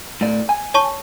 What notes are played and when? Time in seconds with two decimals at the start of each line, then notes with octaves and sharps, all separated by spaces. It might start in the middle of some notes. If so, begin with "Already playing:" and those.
0.21 A2 D5
0.49 G#5
0.74 C#5 A5 C#6